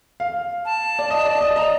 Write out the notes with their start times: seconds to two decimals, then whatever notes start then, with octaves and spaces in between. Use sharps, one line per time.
0.20 F5
0.65 A5
0.99 D5
1.10 D#5
1.25 D5
1.41 D#5
1.56 D#5 A#5